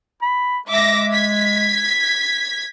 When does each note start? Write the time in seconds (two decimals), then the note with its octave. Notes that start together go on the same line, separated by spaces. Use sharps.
0.22 B5
0.68 G#3 E5 D6 A#6
1.11 G#6 B6